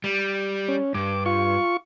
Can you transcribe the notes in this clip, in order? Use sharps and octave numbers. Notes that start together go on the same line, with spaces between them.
G3
C#4
G2 D6
F4 C#6